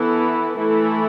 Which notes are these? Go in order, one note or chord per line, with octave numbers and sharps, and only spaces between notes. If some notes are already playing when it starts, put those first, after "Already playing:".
Already playing: E3 B3 E4 A4
E3 A3 E4 A4